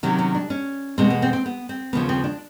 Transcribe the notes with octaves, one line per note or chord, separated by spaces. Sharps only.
C3 D#3 F#3 C#4
C#4
D4
C#4
E2 B2 G#3 B3 C4
B3
C4
C4
B3
C4
D#2 C#3 F3 B3
C4
D4